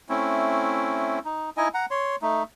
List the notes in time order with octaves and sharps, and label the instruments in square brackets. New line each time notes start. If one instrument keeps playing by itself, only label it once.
[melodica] A3 C4 C#4 E4
D#4
D#4 E4 D#5 G#5
F#5 A#5
C#5 C6
A3 D#4